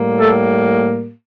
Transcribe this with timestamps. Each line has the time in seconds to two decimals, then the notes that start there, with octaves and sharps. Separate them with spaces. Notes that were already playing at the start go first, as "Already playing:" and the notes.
Already playing: A2 G3 A#3
0.19 A3 A4